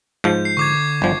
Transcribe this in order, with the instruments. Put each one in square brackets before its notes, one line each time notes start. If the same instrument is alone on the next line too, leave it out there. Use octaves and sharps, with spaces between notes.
[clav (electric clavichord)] G#2 F3 [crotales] G6
[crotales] C7
[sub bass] D3 [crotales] C#6 D6 G#6
[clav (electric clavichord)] G1 F3